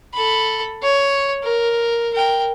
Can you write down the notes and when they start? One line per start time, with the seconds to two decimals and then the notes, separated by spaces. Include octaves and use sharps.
0.14 A4 B5
0.83 C#5
1.43 A#4
2.13 A#4 G5